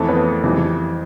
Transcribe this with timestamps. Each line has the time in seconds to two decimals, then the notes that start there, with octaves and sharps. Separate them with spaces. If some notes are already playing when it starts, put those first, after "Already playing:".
Already playing: F2 E3 A3 A4
0.08 B3 B4
0.43 F2 E3 G3